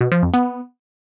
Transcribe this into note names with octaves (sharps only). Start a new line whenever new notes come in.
B2
F3
F2
B3